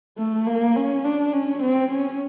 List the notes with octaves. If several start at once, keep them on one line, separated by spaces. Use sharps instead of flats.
A3
A#3
C#4
D4
C#4
C4
C#4